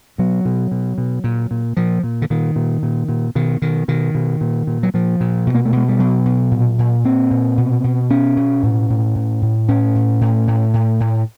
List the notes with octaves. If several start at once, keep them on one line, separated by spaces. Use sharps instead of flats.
B2 F#3
B2
B2
B2
A#2
A#2
A#2 F3
A#2
D3
A#2 D#3
A#2
A#2
A#2
B2 D#3
B2 D#3
B2 D#3
B2
A#2
A#2
F#3
A#2 F3
A#2
B2
A#3
A3
B2 G#3
G3
B2 F#3
B2
A#2
A#2
A#2 C4
A#2
B2
B2
B2 C#4
B2
A2
A2
A2
A2
A2 C#4
A2
A2
A2
A2
A2